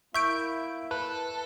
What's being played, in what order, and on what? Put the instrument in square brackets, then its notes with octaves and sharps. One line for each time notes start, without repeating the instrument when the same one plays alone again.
[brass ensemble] A#3 E4 [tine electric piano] E5 [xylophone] C#6 G6 D7
[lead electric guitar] A4 [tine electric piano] B4